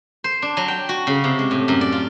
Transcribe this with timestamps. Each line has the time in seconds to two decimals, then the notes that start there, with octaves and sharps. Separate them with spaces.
0.24 C5
0.42 D4
0.57 F#3
0.68 G5
0.89 F#4
1.07 C#3
1.24 C3
1.39 G#3
1.51 A2
1.68 F#2
1.81 D5
1.92 F4